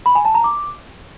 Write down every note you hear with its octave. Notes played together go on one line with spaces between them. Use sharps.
B5
G#5
A5
A#5
D6